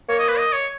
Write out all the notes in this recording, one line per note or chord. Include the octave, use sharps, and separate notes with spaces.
A#3 C#5
D#5
B4
D#5
C#5